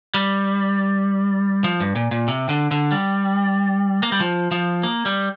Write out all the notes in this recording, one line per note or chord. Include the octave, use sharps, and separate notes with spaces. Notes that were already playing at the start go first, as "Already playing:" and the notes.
G3
F3
G2
A#2
A#2
C3
D3
D3
G3
A#3
G3
F3
F3
A#3
G3